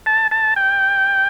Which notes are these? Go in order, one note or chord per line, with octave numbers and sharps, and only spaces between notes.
A5
A5
G5